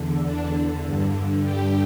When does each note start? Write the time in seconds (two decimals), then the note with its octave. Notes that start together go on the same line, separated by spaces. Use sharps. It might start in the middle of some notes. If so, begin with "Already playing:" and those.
Already playing: E2 D3
0.26 D4
0.84 G2 D3
1.43 G4